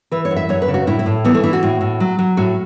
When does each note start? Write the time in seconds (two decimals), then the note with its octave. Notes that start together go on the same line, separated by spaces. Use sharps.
0.11 E3 B4
0.25 C#5
0.31 F#2
0.36 E5
0.49 F#2 C#5
0.62 B4
0.68 C#3
0.74 F#4
0.87 A2 E4
0.99 E4
1.06 A2
1.25 E3 B3
1.34 A3
1.43 E3 E4
1.53 F#4
1.63 A2
1.81 A2
2.00 F#3
2.19 F#3
2.37 A2 F#4